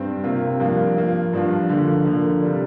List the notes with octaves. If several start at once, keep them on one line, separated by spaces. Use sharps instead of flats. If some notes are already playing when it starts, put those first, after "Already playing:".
Already playing: G2 G3 C4
C3 A#3 F4
G2 F3 A#3 F4
F3 A#3 F4
G2 F3 D4 F4
D3 F3 A#3
D3 F3 A#3
C3 G3 D4